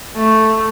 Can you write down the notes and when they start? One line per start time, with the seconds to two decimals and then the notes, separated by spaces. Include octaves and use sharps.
0.15 A3